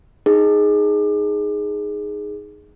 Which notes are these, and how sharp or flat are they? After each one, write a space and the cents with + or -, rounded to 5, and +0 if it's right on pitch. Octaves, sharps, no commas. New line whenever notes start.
D#4 +0 G#4 +0